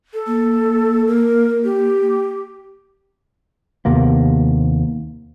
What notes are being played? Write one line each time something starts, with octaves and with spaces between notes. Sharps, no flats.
A4
A#3
A#4
G4
D#2 C3 A#3 B3